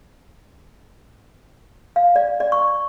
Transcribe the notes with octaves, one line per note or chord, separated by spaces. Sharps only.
F5
D5
D5
C#6